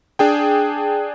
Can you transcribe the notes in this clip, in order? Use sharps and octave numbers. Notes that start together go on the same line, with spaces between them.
D4 G#4 G5